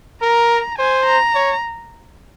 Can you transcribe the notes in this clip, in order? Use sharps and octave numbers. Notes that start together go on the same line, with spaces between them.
A#4 A#5
C5 G#5
A#5
C#5